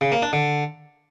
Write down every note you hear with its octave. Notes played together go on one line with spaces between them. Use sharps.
C#3
A#3
D4
D3